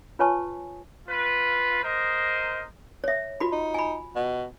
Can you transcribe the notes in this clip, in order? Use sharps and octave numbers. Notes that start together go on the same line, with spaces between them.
F4 B4 C#5 G#5 A5 C#6
F4 B4
A#4 C5 D#5
C#5 E5
F4 F#4 B5
D#4
G#5 B5
B2